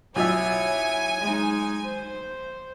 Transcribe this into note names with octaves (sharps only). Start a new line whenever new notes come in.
B1 E4 F4 C#5 E5 G#5
G#3 D#4
C5